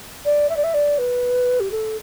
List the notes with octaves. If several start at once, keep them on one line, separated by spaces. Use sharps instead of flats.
D5
E5
D5
E5
D5
B4
G4
A4